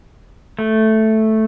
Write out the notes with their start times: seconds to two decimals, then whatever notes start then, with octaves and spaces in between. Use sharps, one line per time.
0.59 A3